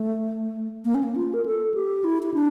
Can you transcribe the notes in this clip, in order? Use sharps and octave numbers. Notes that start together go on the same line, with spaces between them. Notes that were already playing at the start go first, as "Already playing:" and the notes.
Already playing: A3
A#3
C#4
A#3
F4
A#4
A4
G4
E4
E4
D4